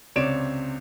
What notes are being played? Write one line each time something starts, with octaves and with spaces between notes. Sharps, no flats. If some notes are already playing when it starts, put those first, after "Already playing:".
C#2 C3 C#5 D5 D7 E7